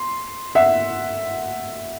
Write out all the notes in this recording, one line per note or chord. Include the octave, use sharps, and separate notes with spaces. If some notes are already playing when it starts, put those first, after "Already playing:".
Already playing: C6
E5 F#5